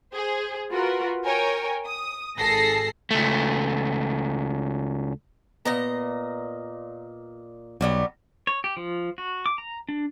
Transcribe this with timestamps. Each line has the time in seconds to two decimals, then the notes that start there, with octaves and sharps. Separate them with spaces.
0.13 G#4 C5
0.71 F4 F#4 A#4 B4
1.24 A#4 C#5 G5 G#5
1.85 D#6
2.38 G#1 G#4 A4 A5 A#6 C7
3.11 C#2 A3
5.65 A#2 B3 D#5 A#5
7.81 B1 F#3 G3 B3
8.47 C#5
8.64 G4
8.77 F3
9.18 F#4
9.46 D6
9.58 A#5
9.89 D4